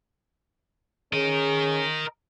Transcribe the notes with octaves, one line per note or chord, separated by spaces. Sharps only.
C#4 G#4 A#4 D#5